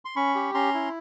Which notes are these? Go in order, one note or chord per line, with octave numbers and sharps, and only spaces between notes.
C6
C#4 B5 C#6
G4
C#4 A#5 C6
E4